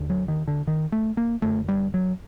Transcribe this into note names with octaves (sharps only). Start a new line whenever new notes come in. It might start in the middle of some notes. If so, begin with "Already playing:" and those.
Already playing: D#2 D3
F#3
D#3
D3
D#3
A3
A#3
F#2 D3 A3
G3
F#3